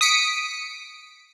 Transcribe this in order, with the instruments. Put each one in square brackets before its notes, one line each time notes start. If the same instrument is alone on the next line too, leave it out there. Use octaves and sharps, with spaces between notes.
[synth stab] D#6 B6 C#7 D7